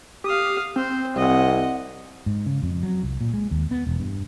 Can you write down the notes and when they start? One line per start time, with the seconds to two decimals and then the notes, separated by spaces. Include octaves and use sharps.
0.24 G4 F5 D#6
0.76 C4 C5
1.17 C2 D#5 F#5
2.26 G#2
2.46 C#3
2.63 F2
2.83 F#3
3.03 C2
3.21 A#2
3.34 G#3
3.51 D#2
3.71 B3
3.87 E1
3.99 G2